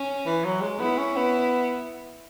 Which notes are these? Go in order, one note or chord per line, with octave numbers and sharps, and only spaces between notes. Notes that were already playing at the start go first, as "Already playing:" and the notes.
Already playing: C#4
E3
F#3
G#3
B3 E4
C#4
B3